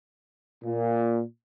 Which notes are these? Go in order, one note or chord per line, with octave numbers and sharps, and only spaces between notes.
A#2